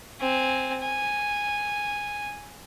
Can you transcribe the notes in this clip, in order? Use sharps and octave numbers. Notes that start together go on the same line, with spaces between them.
C4 G#5
G#5